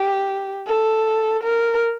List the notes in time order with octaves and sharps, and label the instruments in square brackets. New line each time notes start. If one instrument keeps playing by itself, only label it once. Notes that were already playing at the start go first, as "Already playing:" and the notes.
Already playing: [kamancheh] G4
A4
A#4